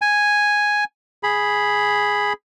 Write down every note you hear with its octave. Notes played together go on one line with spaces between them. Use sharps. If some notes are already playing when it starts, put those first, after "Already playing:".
G#5
G#4 B5